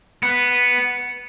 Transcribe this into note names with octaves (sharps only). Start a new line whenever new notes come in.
B3